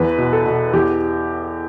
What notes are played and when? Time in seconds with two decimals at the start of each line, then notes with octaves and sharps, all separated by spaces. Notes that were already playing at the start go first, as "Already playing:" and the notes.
Already playing: E2 B4
0.18 B2
0.33 A4
0.46 B2
0.73 E2 G4